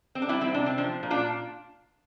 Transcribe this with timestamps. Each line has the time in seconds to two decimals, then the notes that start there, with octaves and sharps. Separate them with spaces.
0.15 C4
0.22 D4
0.29 G3 C4 E4
0.41 C4 E4
0.54 C3 D4
0.66 C4
0.78 F3 D4
1.03 A#2
1.11 D4 F4